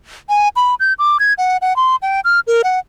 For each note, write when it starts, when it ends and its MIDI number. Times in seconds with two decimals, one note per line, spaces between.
0.29 0.48 80
0.56 0.75 83
0.80 0.93 91
0.99 1.17 86
1.20 1.33 92
1.38 1.57 78
1.62 1.76 78
1.76 1.96 84
2.02 2.20 79
2.25 2.40 89
2.47 2.62 70
2.64 2.79 78